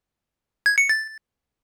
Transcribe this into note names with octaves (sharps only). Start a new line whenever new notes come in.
G#6
C#7
A6